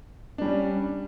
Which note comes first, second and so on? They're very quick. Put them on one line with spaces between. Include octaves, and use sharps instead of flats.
D4 G3 C#4